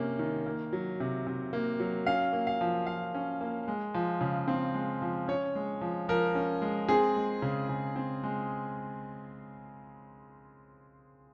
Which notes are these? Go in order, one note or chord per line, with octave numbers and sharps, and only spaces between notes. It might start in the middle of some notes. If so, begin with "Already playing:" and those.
Already playing: C3 A#3 C#4
D#3
A#3
F#3
C3
C3
A#3
F#3
C#4 F5
A#3
F5
F3
F3 F5
C#4
A#3
G#3
F3
C#3
C4
G#3
F3
C#4 C#5
G#3
F3
F3 A#4
C#4
G#3
C4 G#4
G#3
C#3
C#3
C4
G#3